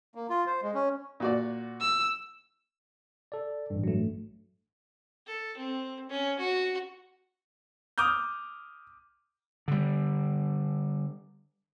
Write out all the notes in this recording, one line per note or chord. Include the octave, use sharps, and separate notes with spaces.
A#3
F4
C5
G#3
C#4
A#2 F#4 D5
E6
A4 D5
A1 G2
F#3 A3
A4
C4
C#4
F#4
D6 D#6 F6 G6
D3 G3